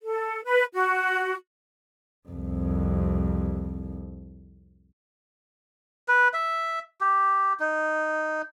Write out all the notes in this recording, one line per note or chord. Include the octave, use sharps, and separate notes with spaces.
A4
B4
F#4
C2 F2
B4
E5
G4
D#4